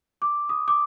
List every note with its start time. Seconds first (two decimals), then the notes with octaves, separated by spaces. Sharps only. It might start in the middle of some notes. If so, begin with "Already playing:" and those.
0.22 D6
0.49 D#6
0.68 D6